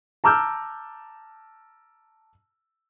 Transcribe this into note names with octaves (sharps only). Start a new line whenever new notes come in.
A5 A#5 D6 E6 F6 G6